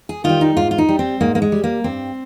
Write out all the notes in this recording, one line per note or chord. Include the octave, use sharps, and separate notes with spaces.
G#4
D#3 G3 F4
D#4
G#2 F4
F4
D#4
G3
C4
G#2 A#3
A#3
G#3
G3
A#3
G2 C4